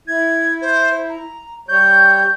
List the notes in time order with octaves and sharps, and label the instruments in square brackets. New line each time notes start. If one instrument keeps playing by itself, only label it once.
[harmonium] E4 [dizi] G#6
[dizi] C5
A#5
[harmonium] G3 C#5 [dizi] G6